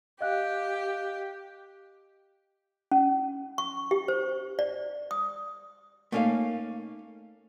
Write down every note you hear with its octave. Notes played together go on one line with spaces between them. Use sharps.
G4 D#5 F5 F#6
C#4
C#6
G4
C5
D5
D#6
A3 A#3 C#4 D#4 F5